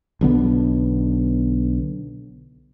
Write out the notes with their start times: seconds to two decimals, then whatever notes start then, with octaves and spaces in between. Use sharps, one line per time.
0.21 B1 D3 B3